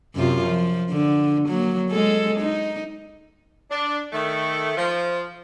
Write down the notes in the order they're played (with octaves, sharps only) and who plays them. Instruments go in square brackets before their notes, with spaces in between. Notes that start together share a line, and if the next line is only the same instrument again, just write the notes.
[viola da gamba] F#2 C3 F4
F3
D3
F#3 A#3
G#3 A4
D#4
[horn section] D4
D#3 A3
F3